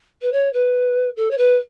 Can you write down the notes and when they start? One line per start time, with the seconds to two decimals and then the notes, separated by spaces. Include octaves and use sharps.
0.21 B4
0.32 C#5
0.53 B4
1.16 A4
1.31 C#5
1.37 B4